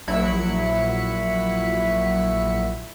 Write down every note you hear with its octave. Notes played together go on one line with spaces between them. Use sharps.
A#1 F#3 E4 B5 C#7